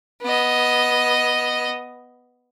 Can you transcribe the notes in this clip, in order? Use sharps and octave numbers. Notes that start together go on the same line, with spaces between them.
B3 D#5